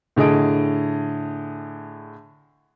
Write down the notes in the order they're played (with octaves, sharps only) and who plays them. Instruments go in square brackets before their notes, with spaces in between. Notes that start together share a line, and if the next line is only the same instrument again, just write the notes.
[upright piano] A2 D3 G#4 D#5 D7